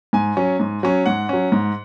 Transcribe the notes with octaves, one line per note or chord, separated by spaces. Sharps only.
G#2 G#5
F#3 C#4
G#2
F#3 C#4
G#2 F#5
F#3 C#4
G#2